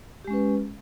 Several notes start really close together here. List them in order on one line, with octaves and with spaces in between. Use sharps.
G4 G#3 C#4 B4